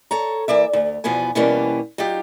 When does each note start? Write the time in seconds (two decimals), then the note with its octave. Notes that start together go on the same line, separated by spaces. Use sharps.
0.11 A4 C#5 A#5
0.48 E3 A#3 D5 E5
0.73 D2
1.04 E2 B2 F3 B3 G#5
1.35 B2 E3 G3 A#3 B3 C#4
1.98 F#3 D#4 F4 G4